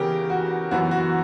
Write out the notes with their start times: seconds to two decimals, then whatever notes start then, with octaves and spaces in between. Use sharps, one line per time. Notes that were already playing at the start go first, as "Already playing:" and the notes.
Already playing: C#3 E3 B3 G4 A#4
0.30 F#4
0.71 F#2 E3 B3 F#4
0.91 F#4